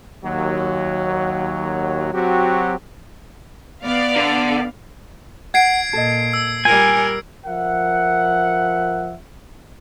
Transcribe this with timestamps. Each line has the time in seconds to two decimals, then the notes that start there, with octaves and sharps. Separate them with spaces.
0.24 D#2 F#3
2.14 F#3 C4 F#4 G4
3.84 B3 D5 F5
4.16 D3
5.54 F#5 G#6 C7 D7
5.93 A#2 A4 D#5
6.33 E6
6.65 G3 F4 A#4 G#5
7.46 F3 A#4 E5 F#5